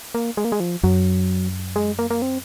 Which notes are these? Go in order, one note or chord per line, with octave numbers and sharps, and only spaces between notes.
A#3
G#3
A#3
G#3
F3
F#2 F#3
G#3
A#3
A#3
C4